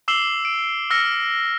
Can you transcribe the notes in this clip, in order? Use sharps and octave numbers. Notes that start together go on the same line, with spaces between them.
D6 E6 C7 E7 F#7 G7
D7
E6 F6 A#6 C#7